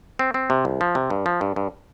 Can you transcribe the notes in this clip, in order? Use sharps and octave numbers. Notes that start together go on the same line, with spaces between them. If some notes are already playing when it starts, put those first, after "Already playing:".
C4
C4
C3
C2
F3
C3
G2
F3
G2
G2